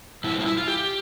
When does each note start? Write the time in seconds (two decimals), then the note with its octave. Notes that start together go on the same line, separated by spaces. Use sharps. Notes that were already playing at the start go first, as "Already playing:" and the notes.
0.24 B2 G3 E4
0.40 F4
0.46 E4
0.57 F4
0.67 G4